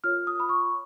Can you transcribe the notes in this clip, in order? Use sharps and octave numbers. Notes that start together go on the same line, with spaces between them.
F4 A#4 C#5 F6
D#6
B5
C#6